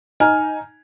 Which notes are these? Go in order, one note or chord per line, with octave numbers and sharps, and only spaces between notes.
D#4 G#5 F6